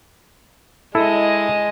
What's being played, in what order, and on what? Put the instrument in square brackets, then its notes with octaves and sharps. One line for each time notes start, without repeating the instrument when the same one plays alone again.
[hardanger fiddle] G#3 D#5 [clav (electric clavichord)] E4 A4